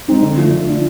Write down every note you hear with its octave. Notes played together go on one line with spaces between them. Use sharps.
G#3 C4 D#4
D3
F3 A3 D4
D3
F3 A3 D4